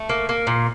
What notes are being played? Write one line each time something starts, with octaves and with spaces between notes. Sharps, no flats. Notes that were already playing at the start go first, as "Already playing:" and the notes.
Already playing: A3 A5
A#3
A#3
A#2